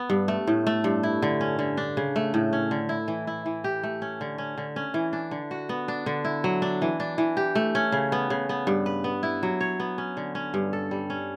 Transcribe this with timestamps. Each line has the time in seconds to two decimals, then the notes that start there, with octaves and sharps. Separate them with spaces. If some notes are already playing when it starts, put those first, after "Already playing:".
Already playing: B3
0.10 G2
0.28 A3
0.47 A2
0.67 A3
0.84 G2
1.03 E4
1.22 D3
1.41 C#4
1.59 D3
1.77 D4
1.97 C#3
2.16 A3
2.34 A2
2.53 C#4
2.71 D3
2.89 E4
3.08 E3
3.27 E4
3.46 E3
3.64 G4
3.83 A3
4.02 C#4
4.21 D3
4.38 C#4
4.57 D3
4.76 C#4
4.94 E3
5.13 D4
5.31 D3
5.51 F#4
5.69 B3
5.88 D4
6.06 D3
6.25 E4
6.44 F#3
6.62 D4
6.82 E3
7.00 D4
7.18 E3
7.37 G4
7.55 A3
7.75 C#4
7.92 C#3
8.12 B3
8.30 C#3
8.49 B3
8.67 G2
8.86 B4
9.04 B3
9.23 E4
9.43 F#3
9.61 C#5
9.80 B3
9.98 C#4
10.17 D3
10.35 C#4
10.54 G2
10.73 A4
10.91 G3
11.10 C#4